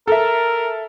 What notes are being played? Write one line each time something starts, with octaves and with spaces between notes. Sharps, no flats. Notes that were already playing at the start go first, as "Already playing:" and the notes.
A4 A#4 E5